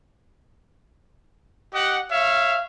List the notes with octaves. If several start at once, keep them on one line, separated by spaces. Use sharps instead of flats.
G4 D#5 F#5
C#5 E5 F5